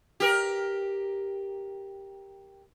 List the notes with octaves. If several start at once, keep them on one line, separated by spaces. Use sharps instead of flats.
G4 A#4